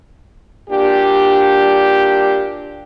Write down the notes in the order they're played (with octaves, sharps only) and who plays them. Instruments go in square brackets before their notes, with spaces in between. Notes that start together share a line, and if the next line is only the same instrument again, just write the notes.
[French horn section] A#2 G3 D4 G4